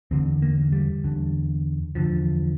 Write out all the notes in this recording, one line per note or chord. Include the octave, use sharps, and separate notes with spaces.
E2 D3 C4
A#3
G3
E2 D3
E2 D3 F3